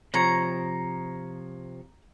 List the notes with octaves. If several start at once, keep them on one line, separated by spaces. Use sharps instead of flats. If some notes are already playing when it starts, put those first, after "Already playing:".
C3 F3 C#5 A#5